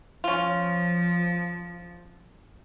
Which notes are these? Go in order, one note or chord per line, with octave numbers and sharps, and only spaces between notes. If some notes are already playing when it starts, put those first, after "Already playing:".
F3 C#4 F4